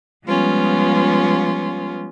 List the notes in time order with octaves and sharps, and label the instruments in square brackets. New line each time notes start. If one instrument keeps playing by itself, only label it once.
[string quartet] F3 G3 G#3 B3 C#4 F4